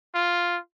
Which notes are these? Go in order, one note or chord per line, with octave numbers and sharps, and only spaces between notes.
F4